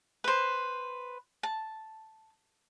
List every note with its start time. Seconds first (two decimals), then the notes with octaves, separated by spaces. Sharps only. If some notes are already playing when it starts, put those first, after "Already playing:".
0.24 B4 C5
1.43 A5